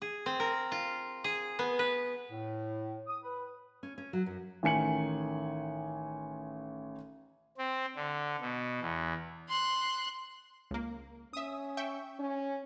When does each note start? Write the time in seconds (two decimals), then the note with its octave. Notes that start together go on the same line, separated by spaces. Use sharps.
0.02 G#4
0.26 C4
0.40 A#4
0.72 F4
1.24 G#4
1.59 B3
1.79 B4
2.31 A2
3.07 D#6
3.23 B4
3.83 C#4
3.98 C#4
4.13 F#3
4.26 F#2
4.63 A1 D#3 G#5 C#7 F#7
7.58 C4
7.96 D3
8.41 B2
8.81 E2
9.48 C6 F#6
10.71 C#2 A#3
11.33 C#4 E5 D#6
11.77 E5 G5 C#6
12.19 C#4